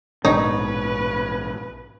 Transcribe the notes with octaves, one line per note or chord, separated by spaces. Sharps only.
A#1 G#2 B2 D#4 B4 C#5